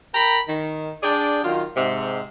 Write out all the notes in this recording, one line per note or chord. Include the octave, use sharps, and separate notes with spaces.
A#4 G5 A#5 B5
D#3
D4 G#4 D5 G5
D#3 F#3 F4
G#2 C3